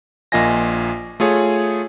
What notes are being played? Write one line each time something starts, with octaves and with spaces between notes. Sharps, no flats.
A#1 A#3 F4 D#5 G#5 A#6
A3 F4 G#4 C#5 G#5